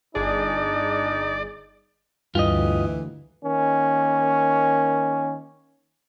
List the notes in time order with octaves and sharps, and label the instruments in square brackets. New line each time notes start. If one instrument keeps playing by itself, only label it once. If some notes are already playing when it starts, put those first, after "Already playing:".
[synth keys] G1 G#4 [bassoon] D4 [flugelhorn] D#4 [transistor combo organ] D5
[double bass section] D2 [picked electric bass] G2 [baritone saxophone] E3 [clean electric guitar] F4 G4 D#5
[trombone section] D#3 A#3 C#4